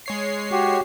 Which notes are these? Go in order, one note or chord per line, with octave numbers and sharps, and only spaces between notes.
G#3 C#5 C7
F#4 G4